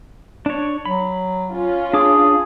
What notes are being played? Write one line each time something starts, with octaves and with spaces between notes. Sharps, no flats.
D4 C#5
F#3 B5
C#4 F4
D4 G#4 D6